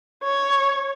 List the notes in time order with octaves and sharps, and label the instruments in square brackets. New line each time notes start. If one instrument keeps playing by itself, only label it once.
[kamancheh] C#5